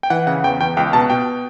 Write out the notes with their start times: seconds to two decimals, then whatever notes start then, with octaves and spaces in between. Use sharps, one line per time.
0.03 G5
0.10 E3 F#5
0.27 C#3 F#5
0.44 E2 G5
0.60 E2 G5
0.77 C#2 G5
0.93 B2 A5
1.10 B2 G5